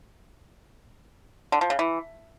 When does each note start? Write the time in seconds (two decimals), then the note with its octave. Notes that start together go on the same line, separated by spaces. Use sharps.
1.52 D3
1.61 F3
1.70 C#3
1.79 E3